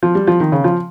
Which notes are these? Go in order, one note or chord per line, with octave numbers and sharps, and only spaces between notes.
F3
G3
F3
D#3
C#3
F3